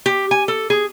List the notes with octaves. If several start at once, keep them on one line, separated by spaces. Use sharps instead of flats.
G4
G#5
A4
G#4